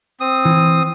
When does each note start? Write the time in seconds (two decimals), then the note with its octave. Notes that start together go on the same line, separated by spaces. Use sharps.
0.20 C4 D#6
0.45 E3